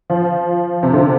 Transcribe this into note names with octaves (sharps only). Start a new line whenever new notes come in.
F3
C3
D3